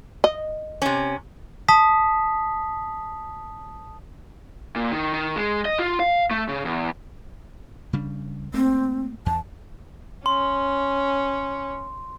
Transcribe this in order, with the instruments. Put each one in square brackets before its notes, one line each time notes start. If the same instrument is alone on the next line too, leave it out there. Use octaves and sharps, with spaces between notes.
[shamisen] D#5
[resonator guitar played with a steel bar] C3 C#4
[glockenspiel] A5 D#6 B6
[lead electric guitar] A#2
D#3
D#3
G#3
D#5
F4
F5
A3
C#3
E2
[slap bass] C#3 G3 D4
[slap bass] A3 A#3 [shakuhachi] C4
[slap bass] E2 [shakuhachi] A5
[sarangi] C#4 [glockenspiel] C6